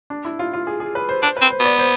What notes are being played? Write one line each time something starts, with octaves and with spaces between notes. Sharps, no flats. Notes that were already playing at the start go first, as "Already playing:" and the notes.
D4
E4
F4
F4
G#4
G#4
B4
C5
D4 C5
C4 B4
C5
B3 D5
C5